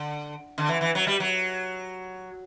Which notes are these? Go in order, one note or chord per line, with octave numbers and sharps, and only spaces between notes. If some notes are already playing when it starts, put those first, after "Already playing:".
Already playing: D3
D3
E3
E3
F#3
G3
F#3